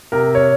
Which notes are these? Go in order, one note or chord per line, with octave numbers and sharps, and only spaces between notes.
C3 A#4
C#5